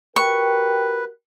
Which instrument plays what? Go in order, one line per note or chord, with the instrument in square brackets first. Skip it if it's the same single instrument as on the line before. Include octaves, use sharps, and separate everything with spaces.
[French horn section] F#4 G4 A#4 [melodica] B4 [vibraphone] G5 [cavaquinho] C#6